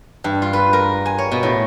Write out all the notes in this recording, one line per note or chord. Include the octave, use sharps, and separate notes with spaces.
G2
F4
B4
A#4
G#5
C#5
B2
A2